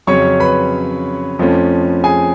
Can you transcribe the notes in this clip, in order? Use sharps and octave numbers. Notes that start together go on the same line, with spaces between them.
F2 C#3 F#3 C#4 C#5 C#6
B4 B5
F2 F3 A3 C#4
G#4 G#5